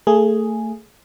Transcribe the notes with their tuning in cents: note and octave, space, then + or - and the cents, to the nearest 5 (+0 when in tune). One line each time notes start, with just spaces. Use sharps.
A3 +25 G#4 +0